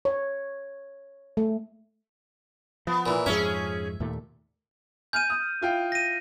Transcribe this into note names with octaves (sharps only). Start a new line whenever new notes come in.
C#5
A3
F3 B3
A#2 E3
F2 G#2 F3 C#4 G#4 E5
D#2 A#2 A3
G#5 F6 G6 D#7
D#6
E4 F4 G5
A#6 D#7